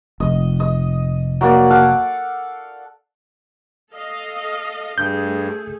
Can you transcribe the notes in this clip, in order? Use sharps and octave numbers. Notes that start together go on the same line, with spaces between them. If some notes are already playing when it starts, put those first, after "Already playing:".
F1 D#5
D#5
F#3 A#3 D5
A4 F5 F#5
A4 D#5 F5
G2 A3 G#4 A4 G6